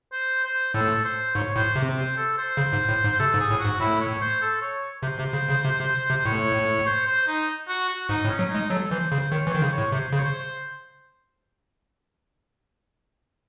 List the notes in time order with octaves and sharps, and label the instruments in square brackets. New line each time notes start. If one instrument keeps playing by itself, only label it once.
[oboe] C5
C5
[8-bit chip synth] A2 [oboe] A4
[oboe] C5
[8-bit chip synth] G#2 [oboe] C#5
[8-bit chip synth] A2 [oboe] C5
[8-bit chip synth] C3
[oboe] C5
A4
C5
[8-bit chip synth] C#3
G#2
A2
G#2
[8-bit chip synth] C3 [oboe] A4
[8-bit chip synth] G#2
[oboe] G#4
[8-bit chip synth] A2
[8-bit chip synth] G#2 [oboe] F#4
[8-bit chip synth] A2 [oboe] E4
[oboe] C#5
C5
A4
C#5
[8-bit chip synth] C3 [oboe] C5
[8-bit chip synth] C3
C#3
C#3
C3
C3
C3
[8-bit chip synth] A2 [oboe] C#5
[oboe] C5
C5
D#4
F#4
F#4
[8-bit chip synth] G#2 [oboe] D#4
[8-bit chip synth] A2
[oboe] C#4
[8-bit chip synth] F#3
[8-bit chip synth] G#3 [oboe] D#4
[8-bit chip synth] F#3 [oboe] A4
[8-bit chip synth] E3 [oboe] C5
[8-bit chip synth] C#3 [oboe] C5
[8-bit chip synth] D#3 [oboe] C#5
[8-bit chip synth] E3
[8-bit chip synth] D#3 [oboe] C5
[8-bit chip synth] C#3
[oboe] C#5
[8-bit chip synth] A2
[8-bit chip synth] C3 [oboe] C5
[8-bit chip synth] C#3
[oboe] C#5
C5